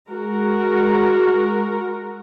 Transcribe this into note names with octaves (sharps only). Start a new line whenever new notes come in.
G#3 F#4 A#4 A#5